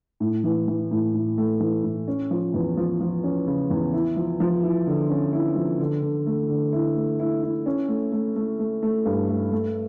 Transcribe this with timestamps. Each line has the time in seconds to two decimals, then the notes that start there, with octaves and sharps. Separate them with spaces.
0.20 A2
0.44 E3
0.68 E3
0.91 A2
1.14 A2
1.38 A3
1.60 E3
1.83 A2
2.08 C#4
2.31 F3
2.54 E2
2.77 F3
3.00 F3
3.24 C#4
3.47 C#3
3.70 E2
3.93 E4
4.17 F3
4.40 F3
4.63 E4
4.87 D3
5.10 C#4
5.33 E4
5.56 F3
5.80 D3
6.02 D3
6.27 A3
6.49 D3
6.73 E4
6.96 A3
7.20 E4
7.43 E4
7.66 C#4
7.88 A3
8.12 A3
8.36 A3
8.59 A3
8.83 A3
9.05 G2
9.28 A3
9.52 A3